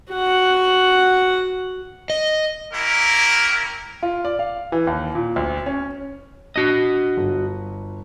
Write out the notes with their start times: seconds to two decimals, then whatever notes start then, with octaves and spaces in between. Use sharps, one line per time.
0.12 F#4 F#5
2.10 D#5
2.73 A#3 C#4 E4 G4 A#4
4.03 F4
4.25 D5
4.39 F5
4.72 E3
4.87 D#2
5.15 A#2
5.36 D2
5.66 C#4
6.56 D4 F#4 D#5
7.17 G1